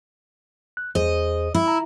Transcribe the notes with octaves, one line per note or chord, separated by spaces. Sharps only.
F#6
E2 G#4 C5 D#5
E4
A#5